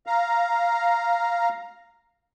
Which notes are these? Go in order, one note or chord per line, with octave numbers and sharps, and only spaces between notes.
F5 A#5